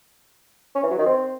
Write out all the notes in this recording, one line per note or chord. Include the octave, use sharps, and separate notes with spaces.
C#4
E3
F#3
D#3
C4